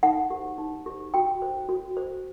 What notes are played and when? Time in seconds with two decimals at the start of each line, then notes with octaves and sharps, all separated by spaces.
0.03 D#4 F#5
0.30 G4 C5
0.58 D#4
0.86 G4 C5
1.14 F#4 G5
1.42 C5
1.69 F#4
1.97 C5